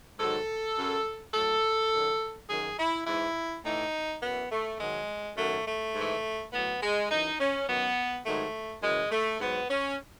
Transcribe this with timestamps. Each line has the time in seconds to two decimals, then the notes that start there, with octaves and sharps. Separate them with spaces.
0.19 G#2 D#3 F#3 A4
0.77 F#2 C#3 F#3
1.33 A2 F#3 A4
1.92 F#2 D#3 F#3
2.49 F#2 D#3 F#3 G#4
2.78 E4
3.07 G#2 E3 E4
3.64 A2 E3 D#4
4.23 F#2 E3 B3
4.52 A3
4.80 G#2 D#3 F#3 G#3
5.37 F#2 D#3 F#3 A3
5.67 A3
5.95 G#2 E3
6.53 A2 F#3 B3
6.82 G#3
7.10 F#2 E3 D#4
7.40 C#4
7.68 F#2 D#3 F#3 B3
8.25 G#2 D#3 F#3 A3
8.83 F#2 C#3 E3 G#3
9.11 A3
9.41 G#2 F#3 B3
9.70 C#4